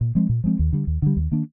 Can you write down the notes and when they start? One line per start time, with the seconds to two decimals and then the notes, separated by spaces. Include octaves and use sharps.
0.01 A#2
0.15 F3 G#3 C4
0.29 A#2
0.44 F3 G#3 C4
0.59 D#2
0.73 D3 G3
0.87 D#2
1.02 D3 G3
1.17 D#2
1.31 D#3 A#3 D4